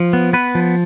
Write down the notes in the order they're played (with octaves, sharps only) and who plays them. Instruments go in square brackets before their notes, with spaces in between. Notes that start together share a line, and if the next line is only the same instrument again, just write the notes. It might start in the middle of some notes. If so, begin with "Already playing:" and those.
Already playing: [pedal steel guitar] F3
B3
B3 B4
F3